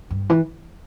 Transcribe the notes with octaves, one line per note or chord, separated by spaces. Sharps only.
G2
E3